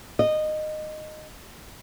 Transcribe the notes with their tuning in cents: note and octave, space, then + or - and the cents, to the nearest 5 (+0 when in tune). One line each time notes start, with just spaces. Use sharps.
D#5 -15